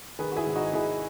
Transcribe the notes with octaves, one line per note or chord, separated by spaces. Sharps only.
D#3 G#4 B4
F#4
E4 G#4
G#1
D#4 F#4
G#1 E4 G#4